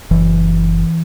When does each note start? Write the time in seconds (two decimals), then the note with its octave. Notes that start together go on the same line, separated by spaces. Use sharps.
0.11 F#1 E3